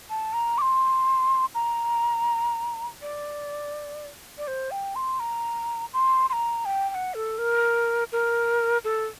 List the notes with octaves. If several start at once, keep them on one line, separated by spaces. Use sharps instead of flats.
A5
A#5
D6
C6
A#5
D5
D5
C5
G5
C6
A#5
C6
C6
A#5
G5
G5
F#5
A4
A#4
A#4
A4